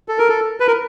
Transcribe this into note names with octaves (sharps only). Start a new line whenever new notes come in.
A4
A#4
A4
B4
A#4